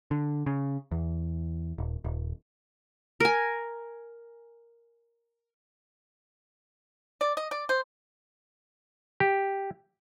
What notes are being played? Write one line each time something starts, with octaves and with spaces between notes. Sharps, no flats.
D3
C#3
E2
D#1
D#1
A#4 G#5
D5
D#5
D5
C5
G4